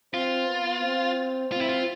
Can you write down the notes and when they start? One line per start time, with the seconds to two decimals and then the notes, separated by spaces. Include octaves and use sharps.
0.14 C4 F4
0.48 B3
0.83 C4
1.52 C4 F4
1.61 E4
1.69 F4